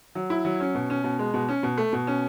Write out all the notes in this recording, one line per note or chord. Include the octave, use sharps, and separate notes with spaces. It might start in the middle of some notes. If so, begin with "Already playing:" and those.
F#3
E4
F#3
C#4
B2
C#4
B2
G#3
B2
C#4
B2
A3
B2
C#4